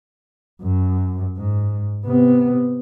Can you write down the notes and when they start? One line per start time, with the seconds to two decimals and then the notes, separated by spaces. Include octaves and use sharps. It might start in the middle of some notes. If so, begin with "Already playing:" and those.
0.63 F#2
1.37 G#2
2.05 C3 B3